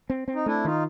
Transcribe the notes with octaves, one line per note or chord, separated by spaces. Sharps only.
C4
C4
D#4
A3 D4 E4
D#3 D#4 F4